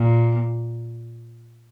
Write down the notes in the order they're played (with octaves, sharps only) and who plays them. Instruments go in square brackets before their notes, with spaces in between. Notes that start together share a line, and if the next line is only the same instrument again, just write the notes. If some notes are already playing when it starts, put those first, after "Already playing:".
Already playing: [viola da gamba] A#2